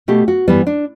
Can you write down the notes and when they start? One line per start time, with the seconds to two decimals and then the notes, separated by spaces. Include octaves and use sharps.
0.08 B2 A3 G4
0.28 F#4
0.48 G2 E3 G3 B3
0.67 D4